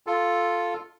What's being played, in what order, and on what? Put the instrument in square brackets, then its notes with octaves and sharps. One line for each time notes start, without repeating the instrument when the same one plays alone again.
[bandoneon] F4 A4